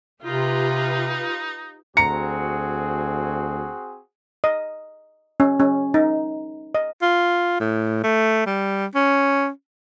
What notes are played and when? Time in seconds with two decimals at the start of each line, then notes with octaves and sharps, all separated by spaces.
0.25 C3 D#4 F4 G4 B4
1.97 D2 C4 F#4 G#4 A#5 C#7
4.44 D#5
5.40 C#4
5.60 C#4
5.94 D#4
6.75 D#5
7.02 F4
7.60 A2
8.04 A3
8.46 G3
8.95 C#4